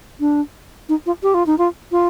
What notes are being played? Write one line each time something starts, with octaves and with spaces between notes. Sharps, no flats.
D4
D#4
F4
G4
F4
D#4
F4
F4